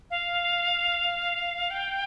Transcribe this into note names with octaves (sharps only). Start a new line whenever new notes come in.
F5
G5